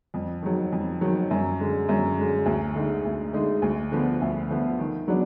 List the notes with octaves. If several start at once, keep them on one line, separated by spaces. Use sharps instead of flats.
F2
D#3 F#3
F2
D#3 F#3
F#2
D3 G#3
F#2
D3 G#3
D2
D3 G#3 D#4
D2
D3 G#3 D#4
D2
D3 F3 B3
D2
D3 F3 B3
D#3
F#3 B3 D4